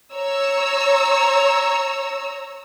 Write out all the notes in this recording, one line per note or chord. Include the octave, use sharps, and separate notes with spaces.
C#5 A#5 E6